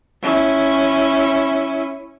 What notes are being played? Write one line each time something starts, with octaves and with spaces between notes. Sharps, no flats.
C#4 E4